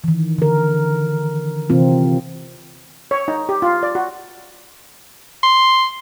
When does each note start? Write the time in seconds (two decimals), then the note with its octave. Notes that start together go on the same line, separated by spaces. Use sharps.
0.04 D#3 E3
0.38 D3 A#4
1.70 C3 E3 C4 F4
3.11 C#5
3.28 D#4
3.49 G4
3.62 F4
3.83 D5
3.95 F#4
5.43 C6